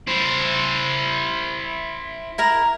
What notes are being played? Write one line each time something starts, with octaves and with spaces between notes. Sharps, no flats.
E4 C5
E4 A#4 A#5